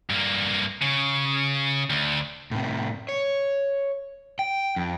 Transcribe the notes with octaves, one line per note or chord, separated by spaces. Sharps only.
G2 A#3
C#3
D2
A2 C3
C#5
G5
F2